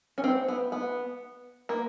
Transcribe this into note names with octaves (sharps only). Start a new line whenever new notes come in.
C#4
C4
B3
B3
A#3